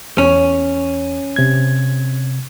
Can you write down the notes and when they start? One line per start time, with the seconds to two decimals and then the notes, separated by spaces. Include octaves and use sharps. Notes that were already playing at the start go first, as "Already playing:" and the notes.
0.18 E2 C#4
1.36 C3 G#6